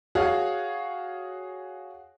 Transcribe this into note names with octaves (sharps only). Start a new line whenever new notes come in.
F#4 G#4 C#5 F5